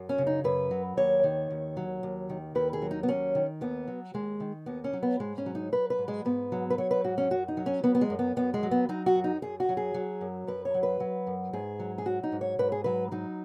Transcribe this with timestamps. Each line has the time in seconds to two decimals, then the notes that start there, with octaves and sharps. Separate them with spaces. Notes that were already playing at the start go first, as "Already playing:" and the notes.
Already playing: F#2
0.09 C#4
0.18 C#3
0.27 D#4
0.44 F#2 B4
0.71 F#3
0.97 D#2 C#5
1.24 D#3
1.50 D#2
1.77 F#3
2.03 D#2
2.30 D#3
2.55 D#2 B4
2.73 G#4
2.82 F#3
2.91 D#4
3.03 B3
3.08 D#2 C#4
3.35 D#3
3.61 D#2 B3
3.87 F#3
4.14 D#2 G#3
4.40 D#3
4.66 D#2 B3
4.84 C#4
4.93 F#3
5.03 B3
5.20 G#2 G#3
5.38 C#4
5.46 F#3
5.55 D#4
5.72 F#3 B4
5.90 B4
5.99 G#2
6.08 G#3
6.25 G#2 B3
6.52 F#3
6.70 B4
6.78 F#3 C#5
6.91 B4
7.04 G#2 F#4
7.18 C#4
7.31 F#2 F#4
7.48 D#4
7.57 F#3
7.66 C#4
7.84 F#3 B3
7.95 B3
8.01 G#3
8.10 F#2
8.19 B3
8.36 F#2 B3
8.54 G#3
8.63 F#3
8.71 B3
8.89 F#3 D#4
9.06 F#4
9.15 F#2
9.24 D#4
9.42 F#2 G#4
9.60 F#4
9.69 F#3
9.77 G#4
9.94 F#3
10.21 F#2
10.47 F#2 B4
10.65 C#5
10.74 F#3
10.83 B4
11.00 F#3
11.27 F#2
11.53 G#2 G#4
11.80 F#3
11.98 G#4
12.06 F#3 F#4
12.23 D#4
12.32 G#2
12.41 C#5
12.59 G#2 B4
12.72 G#4
12.84 F#3 B4
13.11 F#3 D#4